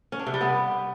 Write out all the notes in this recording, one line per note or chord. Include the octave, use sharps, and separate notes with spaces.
C#4
D4
C3
G3
B3